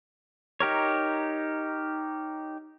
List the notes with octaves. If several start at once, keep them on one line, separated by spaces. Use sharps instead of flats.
D#4 G4 A#4 C#5